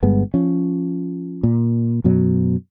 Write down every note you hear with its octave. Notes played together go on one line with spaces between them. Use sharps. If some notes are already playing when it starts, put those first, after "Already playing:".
G1 G2 G#3 B3
F3 C#4
A#2
F#2 B2 F#3